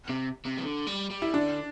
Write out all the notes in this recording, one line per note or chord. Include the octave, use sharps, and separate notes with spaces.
C3
C3
E3
D3
G3
G3
E4
D3 D4